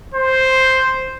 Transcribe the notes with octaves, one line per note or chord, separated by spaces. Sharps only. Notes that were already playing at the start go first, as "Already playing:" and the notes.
C5